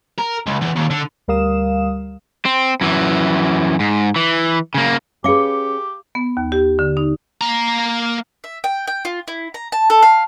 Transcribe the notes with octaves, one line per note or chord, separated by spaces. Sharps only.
A#4
C#2
E2
D#2
D3
D2 G3 A#4 F5 D#6 E7
C4
F#2 E3
G#2
E3
C#3 A#3
C#4 G4 G#4 B4 F5 D6 C#7 G7
B3
D#2
G4
D3
D#4
A#3 A#5
E5
G5
G5
F4
E4
A#5
A5
A4
F5